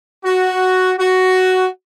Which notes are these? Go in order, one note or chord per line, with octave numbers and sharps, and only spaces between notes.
F#4
F#4